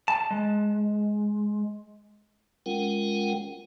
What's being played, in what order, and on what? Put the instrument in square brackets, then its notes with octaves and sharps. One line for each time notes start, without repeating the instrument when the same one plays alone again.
[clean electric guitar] A5
G#3
[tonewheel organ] G#3 C#4 F4 A#4 F#5 G5